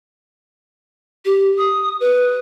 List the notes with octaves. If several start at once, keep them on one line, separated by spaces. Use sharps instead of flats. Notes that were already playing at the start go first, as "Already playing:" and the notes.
G4
D#6
B4